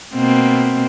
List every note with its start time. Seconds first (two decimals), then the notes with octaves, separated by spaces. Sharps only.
0.15 B2 A#3 C4